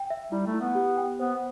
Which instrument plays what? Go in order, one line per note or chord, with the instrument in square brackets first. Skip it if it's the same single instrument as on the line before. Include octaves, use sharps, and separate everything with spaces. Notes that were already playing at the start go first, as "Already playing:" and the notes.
Already playing: [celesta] G5
E5
[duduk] G3 [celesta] E4
[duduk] A3
[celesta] E4
[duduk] B3
[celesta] G4
G5
[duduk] B3 [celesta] C5